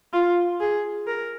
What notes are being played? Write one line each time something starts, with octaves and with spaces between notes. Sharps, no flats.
F4
G#4
A#4